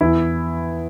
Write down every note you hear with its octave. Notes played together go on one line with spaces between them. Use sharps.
E2 E4